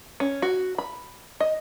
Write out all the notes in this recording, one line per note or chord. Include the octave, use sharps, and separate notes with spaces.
C#4
F#4
B5
D#5